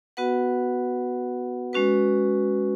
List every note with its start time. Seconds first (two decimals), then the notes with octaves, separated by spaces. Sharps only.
0.17 B3 F#4 B4 F#5
1.73 G#3 C#4 F#4 B4